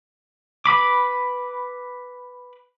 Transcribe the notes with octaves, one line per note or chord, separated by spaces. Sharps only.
B4 B5 D6